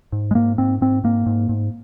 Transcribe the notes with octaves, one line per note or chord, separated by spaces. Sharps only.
G#2
G#3
G#2 A#3
G#2 C4
G#2 C4
G#2 A#3
G#2
G#2